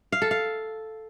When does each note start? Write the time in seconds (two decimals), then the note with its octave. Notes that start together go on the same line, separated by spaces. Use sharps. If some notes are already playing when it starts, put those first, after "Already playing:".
0.12 F5
0.22 A4
0.31 F5